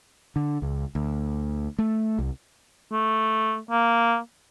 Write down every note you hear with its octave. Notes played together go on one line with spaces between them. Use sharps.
D3
C#2
D2
A3
C2
A3
A#3